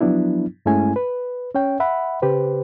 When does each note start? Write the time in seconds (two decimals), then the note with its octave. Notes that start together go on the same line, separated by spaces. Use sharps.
0.01 F3 F#3 B3 D4 E4
0.66 G2 G#3 A3 C#4 E4 G#5
0.96 B4
1.55 C#4 C#5 G5
1.80 E5 F#5 B5
2.22 C#3 G4 B4 C5